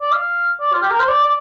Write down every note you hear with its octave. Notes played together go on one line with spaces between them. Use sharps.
D5
F5
D5
F4
G4
A#4
C5
D5
D5